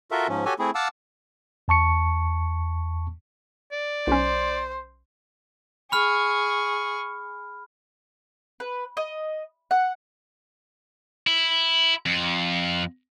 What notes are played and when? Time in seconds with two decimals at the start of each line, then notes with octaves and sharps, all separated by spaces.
0.11 F4 F#4 A4 A#4 E5
0.28 G#2 F3 C#4
0.45 F#4 G4 A4 C#5 G#5
0.59 A3 C4 E4 G#4
0.75 F5 F#5 A5 D6 E6
1.68 E2 A5 C#6 C#7
3.72 D5
4.07 B1 C#4 C5
5.92 G#4 B5 C#6 F6
8.60 B4
8.97 D#5
9.71 F#5
11.27 E4
12.06 F2